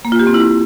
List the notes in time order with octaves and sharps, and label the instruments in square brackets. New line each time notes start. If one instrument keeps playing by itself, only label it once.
[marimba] A#3
F4
G4
C4
E4